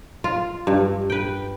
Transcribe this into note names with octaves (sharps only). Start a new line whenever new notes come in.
F4
G2
B4 G5